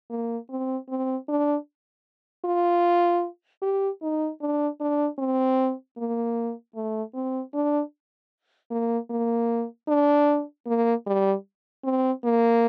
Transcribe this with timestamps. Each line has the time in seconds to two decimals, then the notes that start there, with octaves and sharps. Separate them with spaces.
0.10 A#3
0.49 C4
0.89 C4
1.28 D4
2.45 F4
3.62 G4
4.02 D#4
4.41 D4
4.80 D4
5.18 C4
5.98 A#3
6.75 A3
7.14 C4
7.54 D4
8.71 A#3
9.10 A#3
9.88 D4
10.67 A#3
11.06 G3
11.84 C4
12.24 A#3